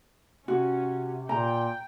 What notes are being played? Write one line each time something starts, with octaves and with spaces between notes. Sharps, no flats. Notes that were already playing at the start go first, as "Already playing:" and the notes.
C3 C#4 F#4
A#2 G5 A#5